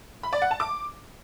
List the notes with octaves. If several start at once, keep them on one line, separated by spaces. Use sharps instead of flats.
B5
D5
F#5
A5
D6